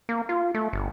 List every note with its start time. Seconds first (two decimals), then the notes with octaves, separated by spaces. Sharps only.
0.09 A#3
0.29 F4
0.54 A3
0.73 G1